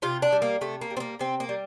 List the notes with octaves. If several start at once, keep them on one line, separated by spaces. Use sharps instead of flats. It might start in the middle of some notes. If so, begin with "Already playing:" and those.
C3 F4
D4
G3
A#3
C3 A3
A#3
G3
C4
A#3
C3 C4
A#3
G3